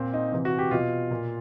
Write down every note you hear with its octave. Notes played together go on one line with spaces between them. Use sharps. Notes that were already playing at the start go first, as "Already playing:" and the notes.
Already playing: A#2 C4
D#4
C3 E3
F#4
G4
B2 F4
A#2